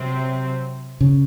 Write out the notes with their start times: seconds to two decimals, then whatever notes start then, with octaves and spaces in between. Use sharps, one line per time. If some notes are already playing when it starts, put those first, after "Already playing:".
Already playing: C3 F#3 C4
1.01 C#3